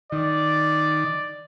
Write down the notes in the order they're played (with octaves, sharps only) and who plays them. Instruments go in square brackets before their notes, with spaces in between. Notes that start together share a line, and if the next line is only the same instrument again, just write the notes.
[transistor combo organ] D#3 [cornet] D5